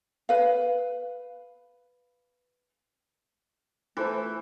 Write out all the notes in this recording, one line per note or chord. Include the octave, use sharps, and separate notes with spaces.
B4 F5
E3 A3 F4 C5 A5